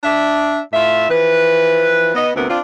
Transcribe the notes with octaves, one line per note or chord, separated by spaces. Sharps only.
D4 E5
A2 F4 E5
E3 F3 B4
B3 D#5
D2 C3 B3 C4 A#4
C4 D4 F4